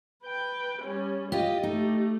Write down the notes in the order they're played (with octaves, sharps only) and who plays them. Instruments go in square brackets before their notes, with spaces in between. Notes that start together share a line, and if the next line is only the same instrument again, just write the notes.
[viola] B4 G5
G3 C#4
[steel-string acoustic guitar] F4 G4 [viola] D#5
[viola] A3 G4 [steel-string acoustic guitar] D#4